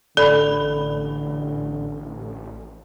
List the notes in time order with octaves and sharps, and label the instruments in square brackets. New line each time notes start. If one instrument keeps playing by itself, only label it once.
[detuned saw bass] A1 [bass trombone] D3 [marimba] A4 [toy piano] D5 B5